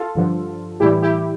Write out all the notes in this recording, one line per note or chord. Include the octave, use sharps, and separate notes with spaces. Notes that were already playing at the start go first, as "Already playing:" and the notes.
Already playing: F4 A4
G2 D3 F3
A2 E3 G3 E4 G4
E4 G4